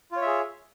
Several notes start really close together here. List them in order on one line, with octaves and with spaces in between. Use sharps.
F4 C#5 E5 G#4